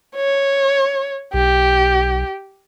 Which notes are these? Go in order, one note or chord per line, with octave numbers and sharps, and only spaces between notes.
C#5
B1 G4